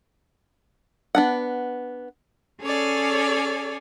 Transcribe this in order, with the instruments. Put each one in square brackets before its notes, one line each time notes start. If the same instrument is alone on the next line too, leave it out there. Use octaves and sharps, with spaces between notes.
[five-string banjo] B3 D4 F#5
[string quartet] C#4 G#4 A4 C#5 D5